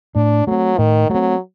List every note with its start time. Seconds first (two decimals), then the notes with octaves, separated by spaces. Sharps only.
0.15 A2 D4
0.47 F#3 A3 C4
0.78 A2 D#3
1.10 F#3 A3 C4